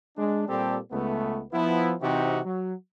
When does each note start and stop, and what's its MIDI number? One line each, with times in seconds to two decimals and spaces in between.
0.17 0.48 56
0.17 0.48 62
0.48 0.78 46
0.48 0.78 55
0.48 0.78 60
0.48 0.78 67
0.48 0.78 69
0.92 1.43 37
0.92 1.43 57
0.92 1.43 59
1.52 1.94 53
1.52 1.94 59
1.52 1.94 64
2.01 2.39 48
2.01 2.39 52
2.01 2.39 60
2.01 2.39 63
2.01 2.39 66
2.01 2.39 67
2.45 2.73 54